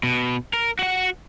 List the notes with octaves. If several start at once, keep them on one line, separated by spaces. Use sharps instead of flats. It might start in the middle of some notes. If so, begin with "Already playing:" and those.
B2
A#4
F#4 F#5